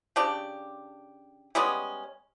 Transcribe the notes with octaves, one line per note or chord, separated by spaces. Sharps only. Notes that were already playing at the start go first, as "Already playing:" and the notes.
C#3 D4 G4
G3 G#3 B3 C#4